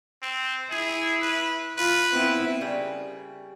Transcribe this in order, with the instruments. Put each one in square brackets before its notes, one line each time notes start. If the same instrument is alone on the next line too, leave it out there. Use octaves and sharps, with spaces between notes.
[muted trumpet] C4
[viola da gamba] E4 [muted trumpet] G#4
[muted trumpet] B4
[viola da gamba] F4 [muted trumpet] B4
[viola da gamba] B3 C4 E4
[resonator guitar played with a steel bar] C#3 G3 A#3